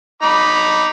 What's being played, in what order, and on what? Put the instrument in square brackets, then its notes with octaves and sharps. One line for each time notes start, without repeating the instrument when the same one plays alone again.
[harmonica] D#4 B5 D6